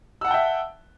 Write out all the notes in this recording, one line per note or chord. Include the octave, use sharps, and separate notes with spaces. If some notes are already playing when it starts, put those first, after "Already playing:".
E5 F#5 G5 A5 E6